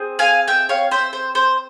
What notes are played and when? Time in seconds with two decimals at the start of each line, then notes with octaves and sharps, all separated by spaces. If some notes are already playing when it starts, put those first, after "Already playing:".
Already playing: C4 G#4
0.19 F5 G#5
0.48 E5 G5
0.69 C#5 F5
0.91 C5 E5
1.13 C5
1.35 C5